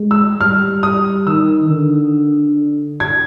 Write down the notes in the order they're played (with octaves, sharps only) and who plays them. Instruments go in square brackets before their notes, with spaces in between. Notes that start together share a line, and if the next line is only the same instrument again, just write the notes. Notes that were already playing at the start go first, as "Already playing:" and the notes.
Already playing: [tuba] G#3
[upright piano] E6
[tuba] G3 [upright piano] F6
[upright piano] D#6
[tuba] D#3 [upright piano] E6
[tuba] D3
[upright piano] G#6